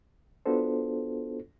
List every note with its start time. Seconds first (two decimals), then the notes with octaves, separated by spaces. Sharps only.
0.46 B3 D4 F4 F#4 A4 C5